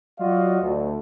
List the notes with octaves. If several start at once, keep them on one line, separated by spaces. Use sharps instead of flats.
F#3 F4 F#4 D5 D#5 F5
D2